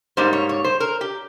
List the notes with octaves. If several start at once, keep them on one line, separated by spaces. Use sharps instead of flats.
G#2 G3 A#3 C5
C#5
C#5
C5
A#4
G4